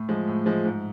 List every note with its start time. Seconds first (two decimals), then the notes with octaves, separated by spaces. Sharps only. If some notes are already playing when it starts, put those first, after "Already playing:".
Already playing: A2
0.09 F3 G#3
0.28 A2
0.46 F3 G#3
0.65 G#2